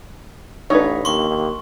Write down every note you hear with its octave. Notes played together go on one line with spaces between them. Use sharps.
A1 D4 D#4 B4 C#5
D#2 C6 C#6